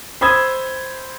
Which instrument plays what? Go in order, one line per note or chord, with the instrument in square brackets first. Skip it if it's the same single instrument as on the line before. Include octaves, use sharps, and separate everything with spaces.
[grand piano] C5 B5 D#6 E6 G#6